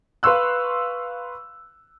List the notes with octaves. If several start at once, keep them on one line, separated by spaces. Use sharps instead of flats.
B4 F5 C6 C#6 E6 F#6